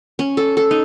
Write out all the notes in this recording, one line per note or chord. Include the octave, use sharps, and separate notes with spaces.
C#4
A4
A4
D#4